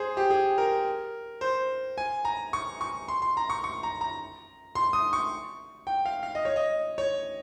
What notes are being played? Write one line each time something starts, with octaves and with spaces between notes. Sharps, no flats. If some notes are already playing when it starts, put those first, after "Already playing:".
Already playing: G#4 C5
G4
G#4
A#4
C5
G#5
A#5
C#6
C#6
C6
C6
A#5
C#6
C#6
A#5
A#5
C6
D#6
C#6
G5
F5
F5
D#5
C#5
D#5
C#5